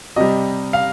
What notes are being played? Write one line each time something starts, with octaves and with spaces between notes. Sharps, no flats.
C3 G3 D#5
F5